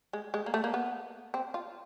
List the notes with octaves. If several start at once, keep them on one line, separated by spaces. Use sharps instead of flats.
G#3
G#3
A#3
A3
A#3
B3
C4
F4